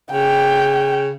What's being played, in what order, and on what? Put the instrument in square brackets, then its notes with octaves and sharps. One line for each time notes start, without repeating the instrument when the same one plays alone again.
[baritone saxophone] C#3 [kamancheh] G5